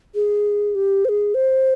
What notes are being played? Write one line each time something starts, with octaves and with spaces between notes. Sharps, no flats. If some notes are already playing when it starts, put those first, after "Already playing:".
G#4
G4
C5
G#4
C5